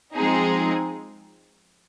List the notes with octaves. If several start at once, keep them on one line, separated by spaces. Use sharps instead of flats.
F3 G#3 C4 D#4 G#4